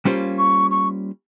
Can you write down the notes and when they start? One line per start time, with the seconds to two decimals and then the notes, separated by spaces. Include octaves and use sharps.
0.05 G3 A#3 C#4 F4 C5
0.38 C#6
0.70 C#6